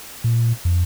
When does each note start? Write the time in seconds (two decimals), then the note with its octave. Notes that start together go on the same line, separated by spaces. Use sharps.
0.24 A#2
0.65 F2